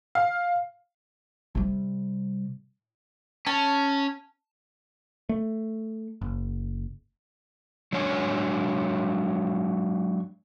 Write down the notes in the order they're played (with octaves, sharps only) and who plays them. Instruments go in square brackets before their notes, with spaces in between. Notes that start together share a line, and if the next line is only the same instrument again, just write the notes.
[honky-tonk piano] F5
[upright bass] C3 G3
[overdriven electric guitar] C#4 [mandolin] A5
[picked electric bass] A3
F#1
[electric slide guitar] F#3 G#3 D4 C#5 G#5